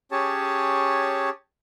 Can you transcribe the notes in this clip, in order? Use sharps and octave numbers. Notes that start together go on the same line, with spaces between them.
C#4 G4 G#4 C#5 A5